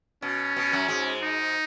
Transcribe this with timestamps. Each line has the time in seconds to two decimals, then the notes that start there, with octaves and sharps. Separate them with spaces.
0.22 B2 C#4
0.56 B2
0.72 F#2 F#3
0.88 G#2 G#3
1.23 D#4